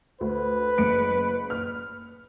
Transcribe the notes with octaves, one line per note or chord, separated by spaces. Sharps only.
D2 B4
F#1 C#7 D7
F6